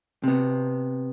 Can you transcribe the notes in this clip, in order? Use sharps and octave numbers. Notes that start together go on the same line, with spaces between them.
C3 B3